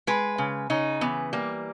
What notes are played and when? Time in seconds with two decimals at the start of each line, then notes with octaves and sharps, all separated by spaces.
0.07 G#3 B4
0.38 C#3
0.70 C#3 D#4
1.01 E3 B3
1.33 G3 A#3